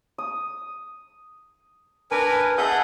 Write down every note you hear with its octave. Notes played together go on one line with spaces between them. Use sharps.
D#6
D4 A#4 B4 G#5
G#4 D#5 E5 F#5 A5 G6